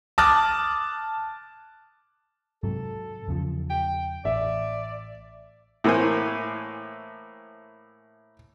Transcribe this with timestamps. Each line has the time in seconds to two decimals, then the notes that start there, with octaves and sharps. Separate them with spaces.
0.18 A5 D6 D#6 F6 F#6 A6
2.63 G#2 C3 F#3 A4
3.28 E2 C#3 F3
3.70 G5
4.25 A1 D5 E5
5.84 A2 E3 A#3 C5 G#5